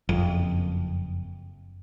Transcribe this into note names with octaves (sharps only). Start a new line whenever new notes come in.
F#1 F2